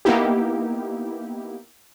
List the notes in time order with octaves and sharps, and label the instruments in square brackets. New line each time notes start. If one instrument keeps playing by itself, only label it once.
[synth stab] A#3 B3 D#4 E4 G4